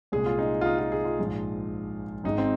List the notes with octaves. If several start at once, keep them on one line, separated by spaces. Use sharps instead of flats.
C2 A#2 G#3 G#4
F4
D#4
F4
D#4
F4
G#4
F4
A#1 G#2 F3 G#3
G#1 G#2 G#3 D#4
C4